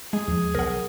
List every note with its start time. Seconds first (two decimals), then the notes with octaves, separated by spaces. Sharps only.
0.13 G#3 G#4
0.28 D#2 F3
0.55 B1 A#4 F#5